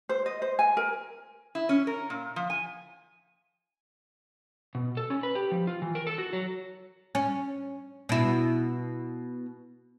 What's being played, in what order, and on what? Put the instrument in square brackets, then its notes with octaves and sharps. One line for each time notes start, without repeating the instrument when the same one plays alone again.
[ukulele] C5
D#5
C5
G#5
A#4
[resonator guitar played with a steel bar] E4
C#4
A#4
A#2
F3
G#5
[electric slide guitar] B2
A4
C#4
B4
G4
F3
F4
E3
A#4
A4
F#4
F#3
[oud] C#4
B2 E4